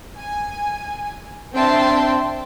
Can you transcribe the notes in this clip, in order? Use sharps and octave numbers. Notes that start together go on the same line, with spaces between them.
G#5
C4 D4 E5 G5 A5 C6